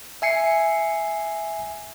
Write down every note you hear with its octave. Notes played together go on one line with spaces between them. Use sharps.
E5 G#5 C7 C#7